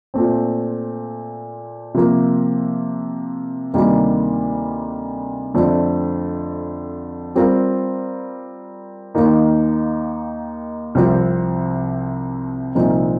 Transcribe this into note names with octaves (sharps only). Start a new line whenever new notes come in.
A#2 A3 C4
C3 F3 A#3 F4
D2 C3 D#3 G3 A#3
F2 D3 A3 C4
G3 C4 F4 A#4
D#2 D#3 A#3 D#4
C2 C3 F3 C4 G4
C2 A#2 F3 C4 D#4